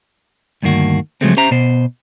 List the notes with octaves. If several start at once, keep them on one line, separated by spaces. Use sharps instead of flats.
D2 G2 D#3 A#3 F#4
C#3 F3 F#3 G#3 A3 C4
C#4 G4 C5 E5 A#5
B2 B3 C5